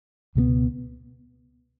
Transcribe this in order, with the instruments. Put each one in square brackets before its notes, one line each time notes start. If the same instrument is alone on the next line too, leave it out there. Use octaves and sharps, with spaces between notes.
[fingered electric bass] C#2 B2 F#3 B3